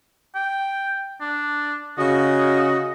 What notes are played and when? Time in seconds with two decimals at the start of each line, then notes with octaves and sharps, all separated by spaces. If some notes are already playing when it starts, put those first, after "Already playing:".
0.35 G5
1.21 D4
1.98 C#3 F#4 D#5